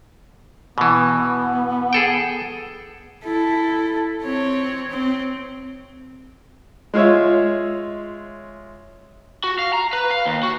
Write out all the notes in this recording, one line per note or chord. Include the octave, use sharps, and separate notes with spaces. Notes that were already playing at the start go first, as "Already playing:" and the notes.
B2 E3 B3
G#4 A4 G5
E4 A4
C4 C#5
C4
G#3 F4 C#5 E5
F#4
F5
A#5
B4
F5
D#2
F#4